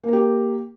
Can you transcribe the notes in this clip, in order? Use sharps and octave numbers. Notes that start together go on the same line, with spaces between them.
A#3 G4 A#4